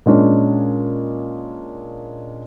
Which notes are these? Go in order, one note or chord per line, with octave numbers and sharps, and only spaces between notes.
A#2 G#3 C#4 D4